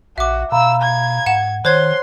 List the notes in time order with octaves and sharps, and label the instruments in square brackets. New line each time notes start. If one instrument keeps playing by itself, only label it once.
[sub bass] A#1 [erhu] F#4 [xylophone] E5 D6
[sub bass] B2 [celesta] F5 A#5 B5 [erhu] E6
[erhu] G#6
[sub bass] G#2 [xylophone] F#5 E7
[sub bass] D#3 [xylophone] C5 C#5 G#6 [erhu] C6 [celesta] F#6